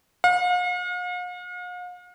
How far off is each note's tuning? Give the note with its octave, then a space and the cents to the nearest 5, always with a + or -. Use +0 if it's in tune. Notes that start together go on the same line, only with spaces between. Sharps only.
F5 +45